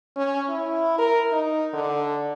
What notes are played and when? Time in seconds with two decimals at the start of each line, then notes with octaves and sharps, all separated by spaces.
0.16 C#4
0.49 E4
0.98 A#4
1.33 D#4
1.74 D3